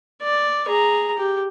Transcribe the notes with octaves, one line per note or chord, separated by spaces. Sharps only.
D5
G#4 A#5
G4